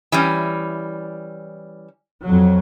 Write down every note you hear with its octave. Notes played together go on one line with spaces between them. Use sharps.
E3 G3 C#4
F2 F#3